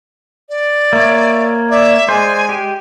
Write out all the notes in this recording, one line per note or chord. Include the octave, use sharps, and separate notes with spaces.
D5
A#3 C#5 E5
D5 E5
G#3 C5 D5 G#5
G4